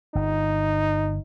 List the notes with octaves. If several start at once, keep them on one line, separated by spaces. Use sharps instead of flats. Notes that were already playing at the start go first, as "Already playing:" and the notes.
G1 D#4